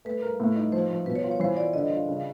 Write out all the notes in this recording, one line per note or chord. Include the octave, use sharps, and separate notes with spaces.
A3 B4
A#4
A2
D#4
F3 C5
F3
B2 B4
C#5
F4
C#5
E3 C5
F4 D5
D3 D#5
F4
C#3